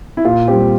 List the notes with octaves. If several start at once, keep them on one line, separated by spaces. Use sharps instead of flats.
E4
A#2 F4
G3 C4 G4